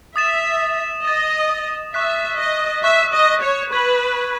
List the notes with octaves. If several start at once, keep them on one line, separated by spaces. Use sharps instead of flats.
E5 D#6 A6 E7
D#5 D#6 A6 E7
E5 C#6 F#6 B6
D#5
E5 C#6 F#6 B6
D#5
C#5
B4 C#6 G#6 D#7 F#7